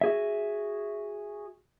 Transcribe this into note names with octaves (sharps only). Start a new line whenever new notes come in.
F#4 G#4 E5